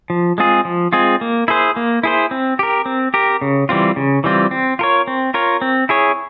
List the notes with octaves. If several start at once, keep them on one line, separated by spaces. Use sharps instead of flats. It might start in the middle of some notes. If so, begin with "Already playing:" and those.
F3
G#3 C4 F4 G#4
F3
G#3 C4 F4 G#4
A#3
E4 G#4 C5
A#3
E4 G#4 C5
C4
G4 A#4
C4
G4 A#4
C#3
E3 G3 C4 F4
C#3
E3 G3 C4 F4
C4
F4 A#4 C#5
C4
F4 A#4 C#5
C4
E4 G#4 C#5